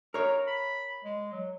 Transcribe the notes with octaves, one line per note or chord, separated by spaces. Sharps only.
A#4 C#5 A#5
B5
G#3
F#3